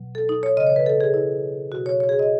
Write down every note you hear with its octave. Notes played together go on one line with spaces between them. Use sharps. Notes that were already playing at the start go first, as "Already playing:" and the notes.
Already playing: B2 F#3
A4
D#4
C#5
C#3 E3 D#5
C#5
B4
A4
G#4
E4
B2 F#3 F#4
C#5
C#5
G#4
D#5